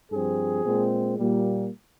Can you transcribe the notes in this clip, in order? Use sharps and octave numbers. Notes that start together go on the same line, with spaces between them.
G2 F3 C4 G#4
A#2 G#3 C4
A#2 G3 A#3